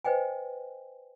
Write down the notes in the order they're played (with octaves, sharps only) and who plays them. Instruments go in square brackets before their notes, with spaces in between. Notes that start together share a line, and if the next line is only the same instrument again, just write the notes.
[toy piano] B4 C5 D#5 G5 G#5